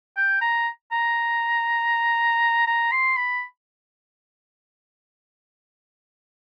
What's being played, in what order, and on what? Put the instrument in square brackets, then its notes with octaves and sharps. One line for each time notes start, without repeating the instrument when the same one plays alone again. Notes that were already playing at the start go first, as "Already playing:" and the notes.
[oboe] G5
A#5
A#5
A#5
C6
B5